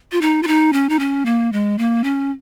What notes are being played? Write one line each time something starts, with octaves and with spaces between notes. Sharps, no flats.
F4
D#4
F4
D#4
C#4
D#4
C#4
A#3
G#3
A#3
C#4